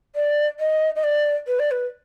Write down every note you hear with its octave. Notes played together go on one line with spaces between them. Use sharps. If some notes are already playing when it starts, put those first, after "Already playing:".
D5
D#5
D#5
D5
B4
D5
B4